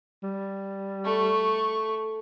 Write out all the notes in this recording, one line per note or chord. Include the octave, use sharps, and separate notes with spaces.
G3
A3 C#6